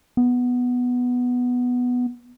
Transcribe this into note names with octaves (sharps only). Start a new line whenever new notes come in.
B3